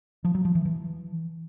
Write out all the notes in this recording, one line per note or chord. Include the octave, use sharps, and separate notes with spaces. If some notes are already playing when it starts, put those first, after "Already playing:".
F3
F#3
F3
E3
E3